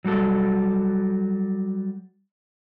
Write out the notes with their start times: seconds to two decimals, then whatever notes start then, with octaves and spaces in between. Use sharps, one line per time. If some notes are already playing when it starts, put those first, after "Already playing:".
0.05 F#3 G3 F#4 A4